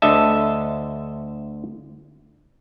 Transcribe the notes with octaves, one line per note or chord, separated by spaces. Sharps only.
D2 D3 A4 D#5 E5 A5